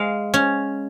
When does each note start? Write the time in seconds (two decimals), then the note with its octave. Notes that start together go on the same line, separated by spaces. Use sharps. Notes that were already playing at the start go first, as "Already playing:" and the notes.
Already playing: G#3 F5
0.34 C#4